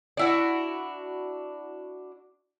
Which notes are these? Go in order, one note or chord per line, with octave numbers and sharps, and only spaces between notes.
D4 E4 F#4